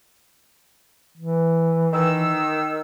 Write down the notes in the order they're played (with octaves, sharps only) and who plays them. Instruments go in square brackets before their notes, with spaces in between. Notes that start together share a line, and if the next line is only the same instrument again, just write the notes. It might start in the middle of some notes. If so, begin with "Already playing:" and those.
[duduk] E3
[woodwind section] D#3 E6